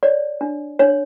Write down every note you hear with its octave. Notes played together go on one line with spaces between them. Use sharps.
C#5 D5
D4
D4 C#5